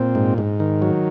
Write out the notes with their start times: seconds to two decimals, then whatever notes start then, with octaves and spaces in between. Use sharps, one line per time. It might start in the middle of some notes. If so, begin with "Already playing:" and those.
Already playing: A#2 C4
0.15 G#2
0.38 G#2
0.60 D#3
0.82 F#3